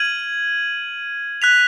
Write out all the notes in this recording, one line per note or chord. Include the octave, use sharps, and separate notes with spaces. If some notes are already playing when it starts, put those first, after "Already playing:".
Already playing: F6 G#6 D#7 F#7
F#6 B6 F7